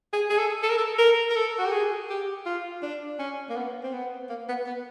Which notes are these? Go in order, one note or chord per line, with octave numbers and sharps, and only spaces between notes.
G#4
G#4
A4
A4
A#4
A4
A#4
A#4
A4
F#4
G4
G#4
G4
F4
D4
C#4
A#3
B3
C4
B3
A#3
B3
B3